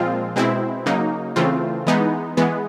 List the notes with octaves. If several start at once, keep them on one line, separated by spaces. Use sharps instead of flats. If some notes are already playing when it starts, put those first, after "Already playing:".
Already playing: A#2 F3 G#3 C4 F4
B2 G#3 C4 E4
C#3 F#3 A#3 D#4
C#3 E3 A3 C4 F4
E3 G#3 B3 D#4
E3 G#3 B3